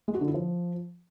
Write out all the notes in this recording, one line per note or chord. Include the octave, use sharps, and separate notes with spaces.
G#3
F#4
D3
E4
F3